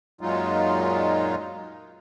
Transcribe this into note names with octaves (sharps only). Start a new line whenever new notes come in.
F#2 A#2 F#3 G#3 D#4 F4